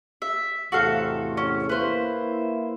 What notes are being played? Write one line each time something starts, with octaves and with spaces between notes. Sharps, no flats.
E5
E2 A2 C3 F#4 A4 F5
C#4
A#3 E4 B4 C5